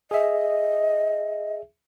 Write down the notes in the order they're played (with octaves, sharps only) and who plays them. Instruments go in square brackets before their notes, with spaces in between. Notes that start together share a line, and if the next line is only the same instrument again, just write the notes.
[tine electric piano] G#4 E5 [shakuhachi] D#5